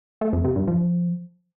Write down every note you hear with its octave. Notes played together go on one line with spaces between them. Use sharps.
A3
F2
C3
G2
F3